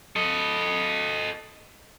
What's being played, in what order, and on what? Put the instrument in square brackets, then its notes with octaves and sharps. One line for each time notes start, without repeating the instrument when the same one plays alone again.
[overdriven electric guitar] A4 D#5